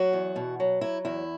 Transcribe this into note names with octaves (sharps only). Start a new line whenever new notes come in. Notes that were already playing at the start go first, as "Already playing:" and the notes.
Already playing: F#3 F#4
E2
B2
F#3
F#3 E4
E2 E4